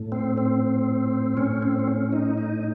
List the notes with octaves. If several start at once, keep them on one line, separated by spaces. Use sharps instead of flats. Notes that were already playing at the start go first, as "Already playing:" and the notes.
Already playing: A2
C4
C4
A2 C#4
C4
C4
C#4
D#4
D#4